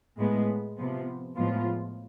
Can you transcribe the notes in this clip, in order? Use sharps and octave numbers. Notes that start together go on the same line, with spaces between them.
A2 G#3 B3
C3 F3 B3
A2 F3 G#3 B3 F4